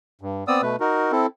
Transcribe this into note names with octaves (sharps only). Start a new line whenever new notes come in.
G2
B3 C4 D5 D#6 E6
B2 A3 B4
D#4 F#4 A#4
C4 E4 A4